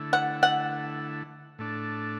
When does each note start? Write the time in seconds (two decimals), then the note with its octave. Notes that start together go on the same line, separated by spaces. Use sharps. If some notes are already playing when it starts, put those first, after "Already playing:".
Already playing: D3 A3 E4
0.13 F#5
0.43 F#5
1.59 A2 A3 D4